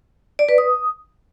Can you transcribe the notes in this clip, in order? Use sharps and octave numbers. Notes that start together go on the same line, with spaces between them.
D5
B4
D#6